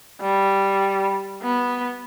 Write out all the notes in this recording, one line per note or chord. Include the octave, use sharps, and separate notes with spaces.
G3
B3